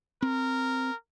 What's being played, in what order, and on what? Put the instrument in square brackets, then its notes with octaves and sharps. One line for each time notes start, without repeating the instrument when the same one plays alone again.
[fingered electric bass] C4 [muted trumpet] A#4